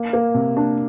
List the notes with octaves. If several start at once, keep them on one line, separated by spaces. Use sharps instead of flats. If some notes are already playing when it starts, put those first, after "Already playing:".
Already playing: A#3
A#3
C3
D4